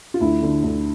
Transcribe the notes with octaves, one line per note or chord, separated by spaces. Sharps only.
F4
D2 E4
D3
D2